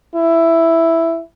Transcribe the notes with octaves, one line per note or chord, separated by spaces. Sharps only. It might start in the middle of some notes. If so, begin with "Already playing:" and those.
E4